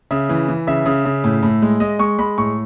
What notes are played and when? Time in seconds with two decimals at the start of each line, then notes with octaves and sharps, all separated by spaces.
0.11 C#3 E5
0.29 E3
0.48 E3
0.67 C#3 E5
0.86 C#3
1.05 C#3
1.24 A2
1.42 A2
1.62 G#3
1.80 G#3 D#5
1.99 G#3 C#6
2.19 G#3 B5
2.38 A2 C#6